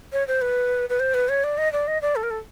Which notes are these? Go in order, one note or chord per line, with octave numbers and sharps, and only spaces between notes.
C#5
C5
B4
B4
C5
B4
C#5
D5
D#5
D5
D#5
D5
A4
A#4
A4